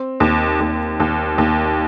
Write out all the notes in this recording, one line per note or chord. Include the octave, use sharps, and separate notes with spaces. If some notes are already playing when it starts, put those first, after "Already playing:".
Already playing: C4
D#2
D#2
D#2
D#2